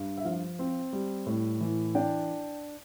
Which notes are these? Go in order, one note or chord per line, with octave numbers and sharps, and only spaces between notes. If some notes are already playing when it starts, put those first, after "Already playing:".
Already playing: G2
E5
F3 F5
C4
G3
A2
E3
D4 G5